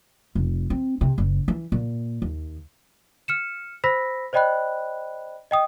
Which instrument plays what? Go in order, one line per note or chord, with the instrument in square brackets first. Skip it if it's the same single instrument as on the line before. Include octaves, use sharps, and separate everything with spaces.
[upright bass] F1
C4
C3
F#1
E3
A#2
D#2
[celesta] F6 C#7 E7
C5 B5 E6 A#6 B6
C5 D5 D#5 G5 B5 F#6
D#5 G5 D#6